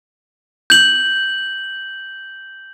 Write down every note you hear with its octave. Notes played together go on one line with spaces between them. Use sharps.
G6 F#7